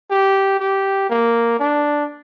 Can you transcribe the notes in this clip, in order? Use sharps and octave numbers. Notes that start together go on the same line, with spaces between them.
G4
G4
A#3
D4